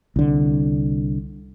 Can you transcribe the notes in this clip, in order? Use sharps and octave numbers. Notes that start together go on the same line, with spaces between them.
C2 D3